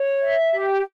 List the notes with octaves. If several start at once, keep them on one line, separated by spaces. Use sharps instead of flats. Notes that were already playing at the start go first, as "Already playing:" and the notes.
Already playing: C#5
E5
G4